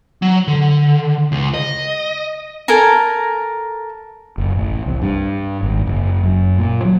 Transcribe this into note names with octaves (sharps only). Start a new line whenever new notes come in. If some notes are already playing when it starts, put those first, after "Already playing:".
F#3
D3
C#2
D#5
A4 A#4 G#5 A#5
F#1
A1
C2
G2
G#1
F#1
F#2
A#2
F#3